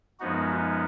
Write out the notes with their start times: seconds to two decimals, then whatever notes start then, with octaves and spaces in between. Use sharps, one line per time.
0.20 F#2 F3 G#3 B3 D#4 F#4
0.51 D#4